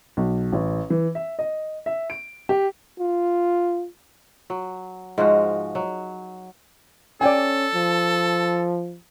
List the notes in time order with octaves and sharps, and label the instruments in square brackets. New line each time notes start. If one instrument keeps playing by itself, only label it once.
[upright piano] B1
A1
E3
E5
D#5
E5
D7
G4
[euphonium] F4
[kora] F#3
G#2 F3 G#3 F#4
F#3
[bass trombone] C#4 [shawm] A4 [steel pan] D5 G5 G#5
[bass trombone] F3